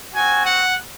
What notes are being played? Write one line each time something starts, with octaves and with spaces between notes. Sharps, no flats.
C4 F#4 G#5
F#5